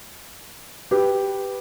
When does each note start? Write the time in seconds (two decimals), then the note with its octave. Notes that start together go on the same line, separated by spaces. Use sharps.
0.91 G4 B4